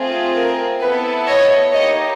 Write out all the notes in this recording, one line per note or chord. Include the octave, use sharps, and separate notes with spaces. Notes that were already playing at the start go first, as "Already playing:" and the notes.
Already playing: A3 C4 F4 G#4
A#4
B3 E4 A4 B4
C#5 D#5
A#3 D#4 G4 C#5 D#5